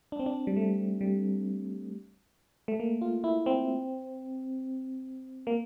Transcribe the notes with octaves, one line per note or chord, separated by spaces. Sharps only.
D4
C4
D4
G3
A3
G3
A3
A#3
F4
E4
C4
A#3